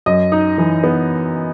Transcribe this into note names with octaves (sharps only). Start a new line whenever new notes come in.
F#2 D#5
D#4
E3
B3